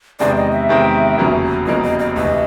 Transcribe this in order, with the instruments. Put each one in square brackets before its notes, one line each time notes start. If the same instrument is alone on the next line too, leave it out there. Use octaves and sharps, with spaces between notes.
[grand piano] E2 C3 D#3 G#3 C4 [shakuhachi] D5
[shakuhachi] D#5
E5
[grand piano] E2 C3 D#3 G#3 C4
F1 E2 C#3 F#3 A#3
[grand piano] F1 E2 C#3 F#3 A#3 [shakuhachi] D#5
[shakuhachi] D#5
D#5
[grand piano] D2 C3 E3 [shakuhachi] D#5